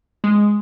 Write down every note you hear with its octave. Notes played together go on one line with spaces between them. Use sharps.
G#3